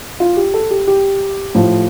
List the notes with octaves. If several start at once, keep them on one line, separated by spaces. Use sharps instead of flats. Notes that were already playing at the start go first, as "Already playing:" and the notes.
F4
G4
A4
G4
G4
A2 F3